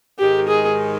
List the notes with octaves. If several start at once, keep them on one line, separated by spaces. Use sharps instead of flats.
G#2 D#3 G#3 D#4 G4
G#4